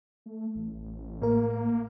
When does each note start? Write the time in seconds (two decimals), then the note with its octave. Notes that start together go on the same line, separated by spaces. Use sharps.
0.26 A3
0.55 A1
1.22 A2 A#3 A#4